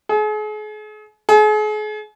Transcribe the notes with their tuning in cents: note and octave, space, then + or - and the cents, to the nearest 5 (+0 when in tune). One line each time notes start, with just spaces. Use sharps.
G#4 +40
G#4 +40